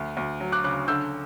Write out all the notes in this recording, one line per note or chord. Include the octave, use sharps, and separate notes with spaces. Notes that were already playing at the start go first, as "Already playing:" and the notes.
Already playing: D2
D2
F#3
D6 F#6
C#3 D6 F#6
D3 E6 G6